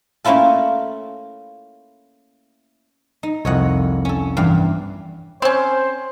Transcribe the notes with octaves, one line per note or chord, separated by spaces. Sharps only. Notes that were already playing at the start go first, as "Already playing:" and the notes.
A3 A#3 C#4 E4 F4 A4
D#4
C2 F2 C#5 D#5 F#5
C#4 A4
E2 G2 F5
C4 C#4 C5